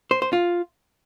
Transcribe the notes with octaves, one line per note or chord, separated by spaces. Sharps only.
C5
C5
F4